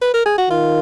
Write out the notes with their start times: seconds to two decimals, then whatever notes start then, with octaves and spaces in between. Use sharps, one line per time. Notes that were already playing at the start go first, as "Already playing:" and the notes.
0.02 B4
0.14 A#4
0.26 G#4
0.38 F#4
0.50 D#3 F4